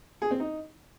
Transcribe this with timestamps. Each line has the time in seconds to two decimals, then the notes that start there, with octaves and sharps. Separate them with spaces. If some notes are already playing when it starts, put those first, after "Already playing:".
0.22 G#4
0.31 C4
0.40 D#4